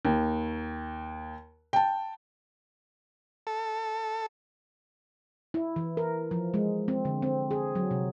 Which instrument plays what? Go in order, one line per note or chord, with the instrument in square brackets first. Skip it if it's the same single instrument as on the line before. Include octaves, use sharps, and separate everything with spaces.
[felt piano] D#2
G5 A5
[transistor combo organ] A4
[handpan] E4
E3
A#4
F3
G#3
C4
D3
C4
G#4
F#3
C3